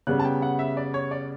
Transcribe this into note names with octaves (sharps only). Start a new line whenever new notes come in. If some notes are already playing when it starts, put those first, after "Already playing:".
C#3 G3 B3 F#6
A5
G5
F#5
E5
D5
C#5
D5